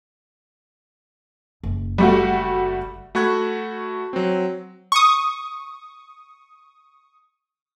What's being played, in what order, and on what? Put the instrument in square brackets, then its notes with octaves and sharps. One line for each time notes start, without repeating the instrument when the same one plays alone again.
[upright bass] F#1
[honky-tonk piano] G3 A3 F#4
[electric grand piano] A3 F#4 B5 C#6 F#6 G#6
F#3 C4
[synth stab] C#6 D#6